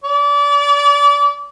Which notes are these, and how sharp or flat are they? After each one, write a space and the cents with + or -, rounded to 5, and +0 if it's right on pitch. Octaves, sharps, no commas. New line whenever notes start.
D5 -30